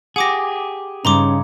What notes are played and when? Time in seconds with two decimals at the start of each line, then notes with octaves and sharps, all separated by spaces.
0.16 G4 G#4 F#5 D6 A#6
1.05 G2 C#3 C#4 D#4 A#5 C6 D6